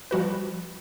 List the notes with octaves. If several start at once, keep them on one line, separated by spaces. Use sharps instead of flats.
F3 G3 F#4 B4